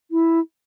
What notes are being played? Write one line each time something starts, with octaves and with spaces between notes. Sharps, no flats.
E4